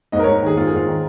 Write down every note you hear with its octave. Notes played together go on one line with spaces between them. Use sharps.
G#2 D#5
A#4
C#5
G#2
A#4
D#3 G#4
G#2 F4
G#4
G#2 F4
D#3